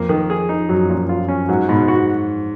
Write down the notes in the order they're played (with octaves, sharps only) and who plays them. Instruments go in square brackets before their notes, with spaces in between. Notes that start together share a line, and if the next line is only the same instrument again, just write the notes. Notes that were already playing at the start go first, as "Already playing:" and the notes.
Already playing: [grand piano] F2 [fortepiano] A#3
[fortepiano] D#3
G#4
D#4
[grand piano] F#2 [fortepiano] F#3
[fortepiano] A#2
F4
C#4
[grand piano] G#2 [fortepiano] F#3
[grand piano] G#2 [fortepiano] B2
[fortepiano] F#4